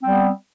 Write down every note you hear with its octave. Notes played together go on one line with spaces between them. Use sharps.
G3 B3 C4